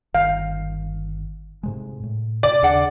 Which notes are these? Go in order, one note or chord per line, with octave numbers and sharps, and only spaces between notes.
G1 D#3 F5
G#2 C3 G#3
A2
C3 D5
D#2 C#3 D4 G#4 F#5